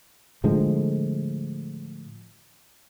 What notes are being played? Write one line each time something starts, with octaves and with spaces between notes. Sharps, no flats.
A2 D3 F3 G#3